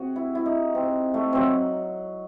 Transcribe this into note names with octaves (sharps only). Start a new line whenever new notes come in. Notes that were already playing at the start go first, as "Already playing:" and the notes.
Already playing: C3 F#4 G#4
E4
E4
D#4
C4
A3
F#3 C4